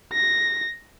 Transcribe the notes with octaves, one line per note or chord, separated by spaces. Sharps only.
A#6